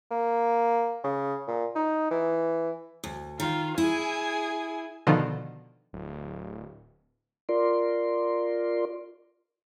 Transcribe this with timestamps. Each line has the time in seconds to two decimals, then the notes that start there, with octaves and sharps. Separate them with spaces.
0.11 A#3
1.04 C#3
1.47 A#2
1.75 D#4
2.11 E3
3.04 D2
3.40 D#3 F4
3.78 E4 G#4 G#5
5.07 B2 D3 D#3 F3
5.93 D1
7.49 F4 A#4 D5 C6